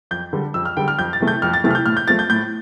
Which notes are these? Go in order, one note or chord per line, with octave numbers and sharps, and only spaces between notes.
F2 G6
D3 G3
F2 E6
F6
D3 G3 G5
F6
F2 G6
A6
C3 E3 A3
G6
F2 F6
A6
C3 E3 A3 A6
F6
G6
A2 F6
G6
F3 A3 A6
G6
A2 G6